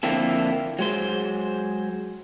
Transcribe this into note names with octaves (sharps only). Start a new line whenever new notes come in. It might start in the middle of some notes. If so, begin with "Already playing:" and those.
D3 F3 A#3 C4 E4 A4
F#3 G#3 C5